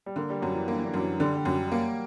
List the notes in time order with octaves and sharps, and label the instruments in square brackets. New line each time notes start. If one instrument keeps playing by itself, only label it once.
[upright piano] G3
[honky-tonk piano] D3 [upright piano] A#3
[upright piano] G3
[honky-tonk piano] F#2 [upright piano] F#3
[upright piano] E3
[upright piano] D3 [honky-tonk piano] A#3
[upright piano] E3
D3
[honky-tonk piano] F#2 [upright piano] F#3
[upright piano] E3
[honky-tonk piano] D3 [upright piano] G3
[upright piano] G3
[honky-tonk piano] F#2 [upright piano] F#3
[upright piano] G3
[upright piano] F#3 [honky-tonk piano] A#3